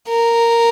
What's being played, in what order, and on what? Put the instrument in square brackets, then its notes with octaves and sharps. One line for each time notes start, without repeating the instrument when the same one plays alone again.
[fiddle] A#4